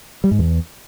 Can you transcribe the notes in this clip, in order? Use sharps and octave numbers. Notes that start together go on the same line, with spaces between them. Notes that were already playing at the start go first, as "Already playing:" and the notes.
G3
G#2
E2